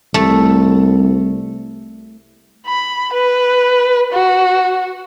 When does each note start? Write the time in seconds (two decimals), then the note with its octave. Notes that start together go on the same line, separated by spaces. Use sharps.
0.14 C2 A3
2.67 B5
3.14 B4
4.12 F#4